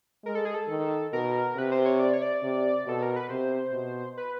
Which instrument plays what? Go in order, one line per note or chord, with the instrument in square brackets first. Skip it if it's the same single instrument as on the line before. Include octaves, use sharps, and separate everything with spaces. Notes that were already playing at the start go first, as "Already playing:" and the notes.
[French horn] G#3 [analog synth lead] A#4
[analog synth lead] A4
G#4
A4
[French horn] D#3
[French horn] B2 [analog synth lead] A#4
[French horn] C3 [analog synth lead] B4
[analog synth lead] C5
C#5
D5
C#5
D5
[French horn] C3
[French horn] B2 [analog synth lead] A4
[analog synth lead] A#4
B4
[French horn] C3 [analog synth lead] C5
[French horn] B2
[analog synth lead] B4